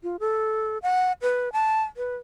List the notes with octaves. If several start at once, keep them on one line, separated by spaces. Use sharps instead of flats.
F4
A4
F#5
B4
A5
B4